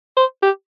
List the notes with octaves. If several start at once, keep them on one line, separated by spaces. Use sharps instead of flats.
C5
G4